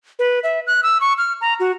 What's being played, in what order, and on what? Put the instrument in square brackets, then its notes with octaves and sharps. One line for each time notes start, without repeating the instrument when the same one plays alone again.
[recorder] B4
E5
F#6
E6
C#6
F6
A#5
F#4